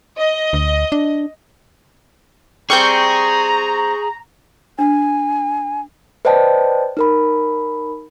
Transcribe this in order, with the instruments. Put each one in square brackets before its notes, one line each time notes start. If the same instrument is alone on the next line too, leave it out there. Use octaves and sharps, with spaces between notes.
[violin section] D#5
[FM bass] D2
D4
[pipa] G3 C4 [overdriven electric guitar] G#4 [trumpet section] A#5 [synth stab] C#6 G6
[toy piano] D4 [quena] G#5
[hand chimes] B4 C5 D5 D#5 G5 A5
D#4 A#4 B5